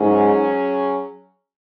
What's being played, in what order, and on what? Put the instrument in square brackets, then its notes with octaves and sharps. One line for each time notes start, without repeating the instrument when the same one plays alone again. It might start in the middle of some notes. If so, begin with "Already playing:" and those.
Already playing: [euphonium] G#2 [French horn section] F#3 C#4 G#4